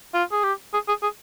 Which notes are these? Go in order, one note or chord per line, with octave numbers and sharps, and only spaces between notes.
F4
G#4
G4
G#4
G#4
G#4